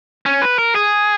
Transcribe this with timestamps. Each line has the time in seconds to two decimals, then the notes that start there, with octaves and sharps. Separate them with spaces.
0.26 C#4
0.42 B4
0.59 A#4
0.75 G#4